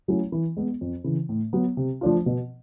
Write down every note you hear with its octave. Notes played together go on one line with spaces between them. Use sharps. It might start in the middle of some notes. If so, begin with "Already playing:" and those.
F#3 A3 C#4 E4
E3
G#3 B3
F2
C#3 E3
A2
F#3 B3
C3
F3 A3 D4 F4
B2